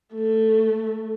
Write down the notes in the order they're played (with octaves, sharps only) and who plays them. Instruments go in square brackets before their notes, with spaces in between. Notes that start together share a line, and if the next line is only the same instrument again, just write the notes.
[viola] A3